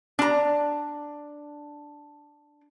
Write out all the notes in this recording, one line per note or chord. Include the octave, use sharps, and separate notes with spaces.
D4 A#5